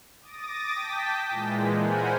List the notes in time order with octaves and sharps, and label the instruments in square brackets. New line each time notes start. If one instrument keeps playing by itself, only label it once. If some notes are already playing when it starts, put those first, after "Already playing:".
[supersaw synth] D6 D#6 A6 A#6
G5 A5 B6
A#2 E3 G#3
A#4 C5 F#5 G#5 B5